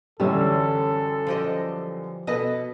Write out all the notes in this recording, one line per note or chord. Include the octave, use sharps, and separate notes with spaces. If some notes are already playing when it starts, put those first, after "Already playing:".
F#2 D3 E3 G3 C#4 A4 E5
F3 G4 D#5
B2 A4 B4 D#5